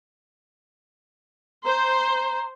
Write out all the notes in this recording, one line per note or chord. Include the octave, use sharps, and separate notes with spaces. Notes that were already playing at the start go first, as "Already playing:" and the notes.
C5 A#5